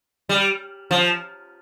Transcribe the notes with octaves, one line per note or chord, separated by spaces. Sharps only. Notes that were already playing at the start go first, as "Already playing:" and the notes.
G3
F3